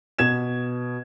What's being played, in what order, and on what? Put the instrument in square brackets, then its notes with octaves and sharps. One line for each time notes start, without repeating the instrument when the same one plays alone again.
[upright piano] B2 G#6 E7